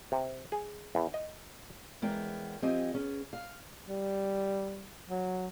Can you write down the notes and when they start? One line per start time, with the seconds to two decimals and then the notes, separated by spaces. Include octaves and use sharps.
0.12 C3
0.52 G#4
0.95 E2
1.14 D#5
2.02 E2 G#3 B3 A#4 C#5 G5
2.62 F3 C4 G4 D#5 G#5
2.94 B3 C#4 G#4
3.33 F5
3.88 G3
5.09 F#3